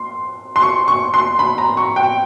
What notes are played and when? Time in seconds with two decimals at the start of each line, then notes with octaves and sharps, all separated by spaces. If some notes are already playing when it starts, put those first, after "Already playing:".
Already playing: C6
0.56 C6
0.62 C#6
0.88 C#6
1.14 C6
1.39 B5
1.58 A#5
1.77 C#6
1.96 G5